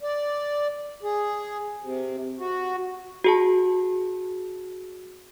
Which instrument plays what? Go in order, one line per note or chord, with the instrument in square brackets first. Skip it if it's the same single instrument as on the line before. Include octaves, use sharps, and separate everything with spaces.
[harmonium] D5
G#4
C3
F#4
[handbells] F#4 G#4 A5